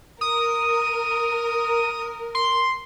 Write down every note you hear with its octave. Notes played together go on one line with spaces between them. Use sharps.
A#4 D#6
C6